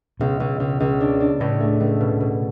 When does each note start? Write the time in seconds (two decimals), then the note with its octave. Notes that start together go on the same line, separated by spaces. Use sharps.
0.20 C#2 B2
0.40 C#2
0.60 C#2
0.80 C#2
1.01 D4
1.20 D4
1.40 C#2 A2
1.60 A3
1.80 C#2
2.00 B2
2.20 B2